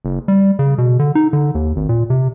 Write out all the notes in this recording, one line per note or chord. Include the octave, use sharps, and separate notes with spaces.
F#1
G3
C#3
B2
D3
D#4
D3
D#2
G#1
A#2
C3